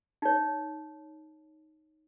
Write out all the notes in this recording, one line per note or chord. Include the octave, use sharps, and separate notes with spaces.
D#4 C#5